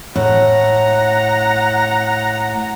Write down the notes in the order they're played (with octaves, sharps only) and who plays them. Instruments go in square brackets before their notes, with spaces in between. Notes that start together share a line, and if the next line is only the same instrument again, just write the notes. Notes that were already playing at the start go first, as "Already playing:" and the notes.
[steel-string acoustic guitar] A2 [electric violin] F#5 A#5